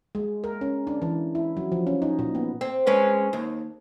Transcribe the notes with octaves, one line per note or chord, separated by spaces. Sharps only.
G#3
A#4
C#4
D4
E3
E4
F#3
F3
C#4
D#4
A#2
B3
C4
G#3 C#4 B4
D#2